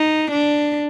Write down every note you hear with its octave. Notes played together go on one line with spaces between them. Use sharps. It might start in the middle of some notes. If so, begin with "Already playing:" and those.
Already playing: D#4
D4